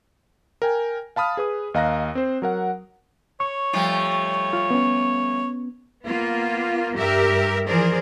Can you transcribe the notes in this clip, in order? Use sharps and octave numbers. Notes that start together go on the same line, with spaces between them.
A#4 G5 G#5
F5 A5 B5 D#6 F6
G#4 B4 D#6
D#2 D#5 F5 A#5 F#6 A#6
C4 C5
F#3 A#4 F#5
C#5 C#6
F3 G3 A3
F4
B3 C#4
A#3 B3 F4
G2 G4 A#4 E5
E3 F3 G#4 A#4 C5 D5